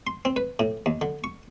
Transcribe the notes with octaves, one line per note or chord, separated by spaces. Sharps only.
C6
C4
B4
A2
D#2
D3
C#6